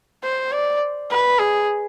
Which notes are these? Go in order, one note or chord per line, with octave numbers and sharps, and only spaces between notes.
C5
D5
B4
G#4